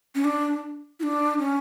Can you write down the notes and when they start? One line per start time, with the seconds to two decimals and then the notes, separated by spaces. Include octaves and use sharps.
0.15 C#4
0.24 D4
1.00 E4
1.03 D4
1.39 C#4